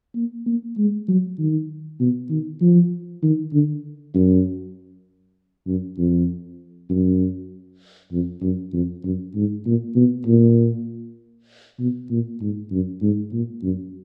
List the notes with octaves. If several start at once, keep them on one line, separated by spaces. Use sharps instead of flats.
A#3
A#3
G#3
F#3
D#3
B2
D#3
F3
D#3
D3
F#2
F#2
F2
F#2
F2
F#2
F2
F#2
G#2
A#2
B2
A#2
B2
A#2
G#2
F#2
G#2
A#2
F#2